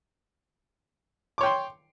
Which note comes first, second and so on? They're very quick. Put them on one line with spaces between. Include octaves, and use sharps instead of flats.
D6 C#5 G5 C6